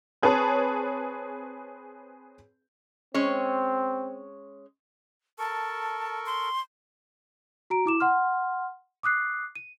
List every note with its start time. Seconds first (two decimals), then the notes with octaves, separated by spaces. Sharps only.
0.22 C4 G#4 B4 C#5 A5
3.14 G#3 C4 C#4 C#5
5.39 A4 A#4 A5 C#6
6.26 C6
7.70 F#4 A#5 D7
7.86 E4 D6 E7
8.00 F#5 C6 F6
9.03 D6 D#6 F#6 C7
9.56 D#7